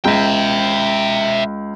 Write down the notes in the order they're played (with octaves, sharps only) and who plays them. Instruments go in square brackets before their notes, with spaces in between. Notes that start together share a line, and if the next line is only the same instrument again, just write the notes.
[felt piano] C#2 [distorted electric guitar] E5 G5